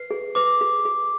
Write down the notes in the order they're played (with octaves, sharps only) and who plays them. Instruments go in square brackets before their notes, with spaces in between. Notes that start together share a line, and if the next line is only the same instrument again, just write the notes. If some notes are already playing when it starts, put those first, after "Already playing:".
Already playing: [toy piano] B4 [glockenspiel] C7
[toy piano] G#4
[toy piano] B4 [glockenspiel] D6
[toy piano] G#4
G#4